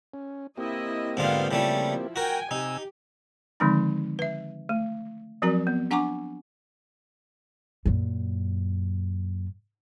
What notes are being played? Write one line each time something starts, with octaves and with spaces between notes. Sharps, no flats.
C#4
A#3 C4 E4 G4 D#5
G#2 D3 B3 F4 F5 G5
C#3 F3 G3 A3 E4
F#4 A#4 G5 G#5
C3 D#4 G4 G#5 E6
D3 D#3 F3 G#3 C4 D#4
B4 E5
A3
F3 F#3 C4 F#4 A#4 A#5
B3
D4 F#5 G#5 A#5 C#6 D6
F#2 A#2